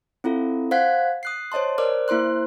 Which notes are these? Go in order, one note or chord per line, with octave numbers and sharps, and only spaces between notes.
C4 E4 F4 A4
C5 F5 F#5 F#6 G#6 B6
D#6 F#6 C7
C5 C#5 D#5 A5 C6
A#4 C5 D5 D6 F6
A#3 E4 C5 C6 F#6